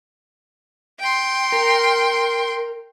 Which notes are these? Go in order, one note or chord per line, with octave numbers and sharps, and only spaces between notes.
G5 C6
A#4